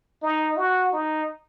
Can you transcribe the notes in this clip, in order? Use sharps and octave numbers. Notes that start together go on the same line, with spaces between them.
D#4
F#4
D#4